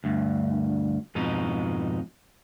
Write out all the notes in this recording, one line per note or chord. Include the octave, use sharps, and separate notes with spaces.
D2 G2
F2 G#2 B2 D#4